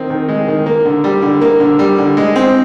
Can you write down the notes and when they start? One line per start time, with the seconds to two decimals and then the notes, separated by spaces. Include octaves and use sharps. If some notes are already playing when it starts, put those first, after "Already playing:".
Already playing: D#3 C4
0.10 D#3
0.29 G#3
0.48 D#3
0.66 A#3
0.85 D3
1.04 G3
1.22 D3
1.41 A#3
1.60 D3
1.79 G3
1.98 D3
2.17 G#3
2.36 C4